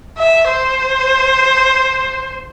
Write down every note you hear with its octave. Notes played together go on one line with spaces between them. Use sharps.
E5
C5